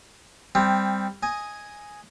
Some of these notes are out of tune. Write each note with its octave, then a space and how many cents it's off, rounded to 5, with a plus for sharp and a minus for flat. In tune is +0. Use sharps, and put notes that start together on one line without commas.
G3 +15 C4 +0
D#5 +5 G#5 +0